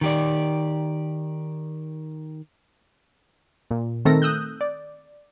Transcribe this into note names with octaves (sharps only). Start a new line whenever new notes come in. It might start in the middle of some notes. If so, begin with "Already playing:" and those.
D#3 G4 D5
A#2
D#3 A3 C4 A4 A#4 A#6
D#6 E6 F#6 G6
D5